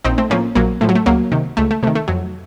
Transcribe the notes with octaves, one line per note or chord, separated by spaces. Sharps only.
A#1 C4 D#4
A3 C4
A2 F3 A#3 C#4
A#1 F#3 A#3
A2 F3 A3
F#3
A3
C#2 F#3 A#3
C3 D#3
C#2 A3
A3
C3 D#3 A3
A3
F2 F#3